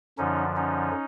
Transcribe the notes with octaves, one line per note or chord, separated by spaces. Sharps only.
F#2 D3 F3 C#4 D#4
C#4 D#4